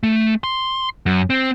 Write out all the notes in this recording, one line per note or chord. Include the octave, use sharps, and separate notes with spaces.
A3
C6
F#2
C4